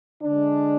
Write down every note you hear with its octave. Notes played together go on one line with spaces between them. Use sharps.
D3 G#3 D4